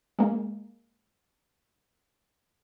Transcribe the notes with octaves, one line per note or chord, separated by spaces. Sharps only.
G#3 A#3